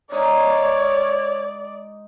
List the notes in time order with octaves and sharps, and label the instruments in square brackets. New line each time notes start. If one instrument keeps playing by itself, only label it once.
[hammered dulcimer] G#3 D#4 [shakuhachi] C#5 [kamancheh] D5